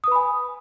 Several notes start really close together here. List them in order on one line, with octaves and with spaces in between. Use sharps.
D#6 B4 B5 G#5